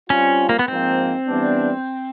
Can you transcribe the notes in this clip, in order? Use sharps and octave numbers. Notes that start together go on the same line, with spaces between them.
G3 C4 C#4 F4
A#3
B3
G#2 F3 A#3 C4
E3 G3 B3 D4